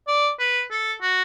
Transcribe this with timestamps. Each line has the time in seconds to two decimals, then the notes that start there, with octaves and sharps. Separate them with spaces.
0.07 D5
0.40 B4
0.71 A4
1.02 F#4